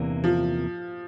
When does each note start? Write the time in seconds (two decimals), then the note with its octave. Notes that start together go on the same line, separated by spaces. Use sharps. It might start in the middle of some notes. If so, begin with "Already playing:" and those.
Already playing: E2 C3 E3 A#3
0.24 F3